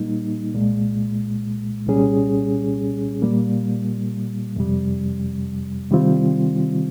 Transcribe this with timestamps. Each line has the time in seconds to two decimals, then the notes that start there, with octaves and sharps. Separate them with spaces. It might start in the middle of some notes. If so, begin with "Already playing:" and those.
Already playing: A#2 G3 A#3 D#4
0.54 C2 A#2 G#3
1.87 C2 A#2 G3 C#4 G#4
3.22 A#2 G3 A#3
4.56 F2 C3 G3
5.90 C3 D#3 G3 C4 F4